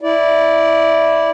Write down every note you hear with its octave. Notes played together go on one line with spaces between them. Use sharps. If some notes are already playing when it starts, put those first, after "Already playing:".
E4 D5